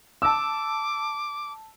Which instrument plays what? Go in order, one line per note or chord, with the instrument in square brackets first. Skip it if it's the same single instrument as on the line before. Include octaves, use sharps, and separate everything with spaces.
[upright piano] A5 E6 [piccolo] D6